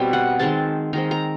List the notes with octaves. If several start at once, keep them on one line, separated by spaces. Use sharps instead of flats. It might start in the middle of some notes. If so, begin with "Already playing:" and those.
Already playing: B2 G3 C4
F#5
D#3 G#3 C4 A5
D#3 G#3 C4 A#5
A#5